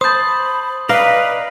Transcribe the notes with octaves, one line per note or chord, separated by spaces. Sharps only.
C5 A5 B5 D#6 G6
B4 D5 D#5 F5 A#5